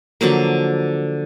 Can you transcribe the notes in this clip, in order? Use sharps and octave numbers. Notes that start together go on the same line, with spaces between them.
D3 F3 F#3 A#3